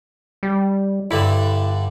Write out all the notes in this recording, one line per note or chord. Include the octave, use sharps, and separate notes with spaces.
G3
G2 D3 E4